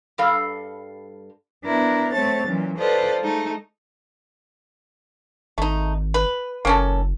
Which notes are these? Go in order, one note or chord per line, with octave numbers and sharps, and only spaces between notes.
G2 G3 A4 F5
B3 D4 E4 A#4
A3 C4 C#5 A5 A6
A#2 E3 F#3 C#4
F4 A4 B4 C5 D5 D#5
G#3 A3 D#4
G#1 A3 D#4
B4
F#1 A#3 C#4 A4